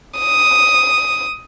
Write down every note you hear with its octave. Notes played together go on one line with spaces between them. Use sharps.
D#6